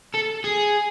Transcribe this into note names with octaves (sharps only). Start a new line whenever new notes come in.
A4
G#4